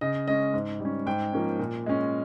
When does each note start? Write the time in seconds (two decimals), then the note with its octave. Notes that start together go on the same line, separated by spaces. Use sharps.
0.01 C#3 D#5
0.28 G#3 C#4 D#5
0.54 G#2
0.80 G3 C#4
1.06 G#2 G5
1.33 F3 A#3 C#4
1.59 A#2
1.86 G#3 C#4